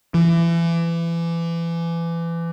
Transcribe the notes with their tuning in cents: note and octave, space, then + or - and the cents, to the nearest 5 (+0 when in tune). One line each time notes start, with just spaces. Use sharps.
E3 +30